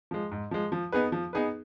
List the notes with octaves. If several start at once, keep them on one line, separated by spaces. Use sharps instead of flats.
F3 G#3
G#2
F3 G#3
F3
B3 D#4 G#4 B4
F3
B3 D#4 G#4 B4